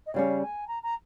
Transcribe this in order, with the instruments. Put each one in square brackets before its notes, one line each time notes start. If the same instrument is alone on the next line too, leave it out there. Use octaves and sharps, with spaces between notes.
[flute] D#5
[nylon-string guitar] C#3 G3 C#4 [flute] F5
[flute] G#5
A#5
A#5